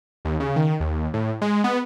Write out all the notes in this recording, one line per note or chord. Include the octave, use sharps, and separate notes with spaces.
D#2
C#3
D#3
D#2
A2
G#3
B3